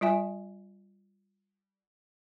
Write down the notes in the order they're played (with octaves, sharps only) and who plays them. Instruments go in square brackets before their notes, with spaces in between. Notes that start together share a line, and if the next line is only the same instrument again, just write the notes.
[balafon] G3 F4 E5 G#5